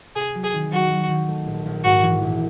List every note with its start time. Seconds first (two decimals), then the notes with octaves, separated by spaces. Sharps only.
0.15 C3 G#4
0.35 F#3
0.43 G#4
0.53 D#3
0.72 F#3 F#4
0.91 F#3
1.09 D#3
1.28 A3
1.46 A#1
1.65 A#1
1.84 G#2 F#4
2.02 E3
2.22 A#1